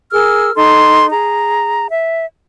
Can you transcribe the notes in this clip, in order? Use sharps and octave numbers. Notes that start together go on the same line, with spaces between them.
G#4 A#4 E6 F6
D#4 A4 C6
G#4 A#5
E5